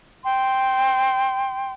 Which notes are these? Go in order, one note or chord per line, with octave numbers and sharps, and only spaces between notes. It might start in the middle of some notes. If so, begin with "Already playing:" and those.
G5 C6